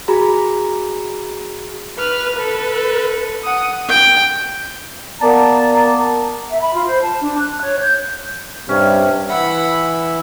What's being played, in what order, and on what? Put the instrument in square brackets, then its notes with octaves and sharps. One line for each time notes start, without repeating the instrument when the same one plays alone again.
[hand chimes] F#4 G#4 A#5 B5
[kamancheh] B4 F6
A4 B4
F#5 D#6
[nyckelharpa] G5
[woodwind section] A#3 B3 D5 A5 A#5
[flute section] E5
B5
F4
C5
A5
D4
F#6
C#5
G6
[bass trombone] G2 [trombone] C3 [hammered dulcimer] C#4
[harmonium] E3 E5 [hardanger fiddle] F#5 B5